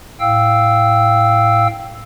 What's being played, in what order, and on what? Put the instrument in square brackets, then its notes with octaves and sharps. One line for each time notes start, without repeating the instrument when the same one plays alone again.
[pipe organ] A2 F5 G5 E6